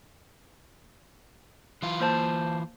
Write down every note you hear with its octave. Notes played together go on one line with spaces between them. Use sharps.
E3 F4
A#3 C5 A5